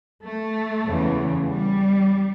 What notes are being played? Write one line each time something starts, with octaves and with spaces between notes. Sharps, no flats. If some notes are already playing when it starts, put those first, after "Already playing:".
A3
E2 C#3 E3
G3